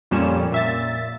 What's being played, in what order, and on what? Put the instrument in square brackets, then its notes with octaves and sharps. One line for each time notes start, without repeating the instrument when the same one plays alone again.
[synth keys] F2 A#2 G3 C#4 E7
A#2 E5 A6